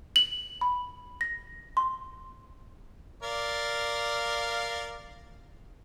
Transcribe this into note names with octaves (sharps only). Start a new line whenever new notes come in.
F#7
B5
A#6
C6
A#4 D5 F5